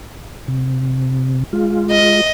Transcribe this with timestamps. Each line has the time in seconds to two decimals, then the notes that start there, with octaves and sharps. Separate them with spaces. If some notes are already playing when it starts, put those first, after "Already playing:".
0.48 C3
1.53 G#3 F4
1.91 D#5